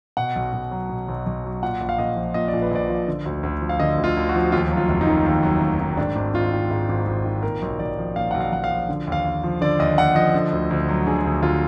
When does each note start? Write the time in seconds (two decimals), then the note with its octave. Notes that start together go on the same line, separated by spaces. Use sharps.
0.17 B2 F#5
0.36 B1
0.53 B1
0.71 F#3
0.89 B2
1.08 B1
1.26 B1
1.45 F#3
1.63 A#2 F#5
1.81 A#1
1.89 F5
1.98 A#1 D#5
2.16 F3
2.34 A#2 D#5
2.48 D5
2.53 A#1
2.62 B4
2.71 A#1 D5
2.89 F3
3.07 D3
3.26 D2
3.43 D2
3.61 F3
3.69 F5
3.79 D3 D#5
3.98 D2
4.04 F4
4.17 D2
4.29 F#4
4.35 F3
4.52 D#2 F4
4.71 F#3
4.77 F4
4.89 F1
5.01 D#4
5.07 D#3
5.26 D#2
5.43 F#3
5.61 F1
5.80 D#3
5.97 G#2 D4
6.16 G#1
6.34 G#1 F4
6.53 D#3
6.70 G#2
6.89 G#1
7.07 G#1
7.25 D#3
7.43 A#2 A#4
7.62 B1
7.79 B1 D5
7.98 F3
8.16 A#2 F5
8.31 B1 F#5
8.41 F5
8.52 B1 F#5
8.64 F5
8.70 F3
8.89 D3
9.07 D#2 F5
9.25 D#2
9.44 F3
9.61 D3 D5
9.79 D#2 D#5
9.98 D#2 F#5
10.15 F3 D#5
10.34 D3
10.53 D2
10.71 D2
10.89 F#3
11.06 D3 G#4
11.25 D2
11.42 D2 F4